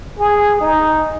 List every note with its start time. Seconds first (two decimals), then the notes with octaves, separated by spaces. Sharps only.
0.19 G#4
0.61 D#4